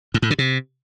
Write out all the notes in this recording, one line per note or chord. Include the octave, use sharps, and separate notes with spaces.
G#2
A2
D3
C3